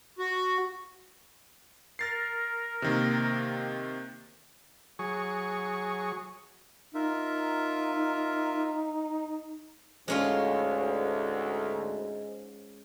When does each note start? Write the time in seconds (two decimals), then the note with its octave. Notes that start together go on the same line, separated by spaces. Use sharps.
0.18 F#4
1.99 A#4 F6 A6 C7
2.82 C3 D#3 A#3
4.99 F#3 G#4 C#6
6.95 D#4 F4 A#4 E5
10.08 D2 G#2 G#3 C#4 F4